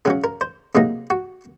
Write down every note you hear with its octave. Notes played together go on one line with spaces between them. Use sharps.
C#3 F#3 C#4 G#4
A#4
C5
C3 F#3 A#3 D#4 G#4
F#4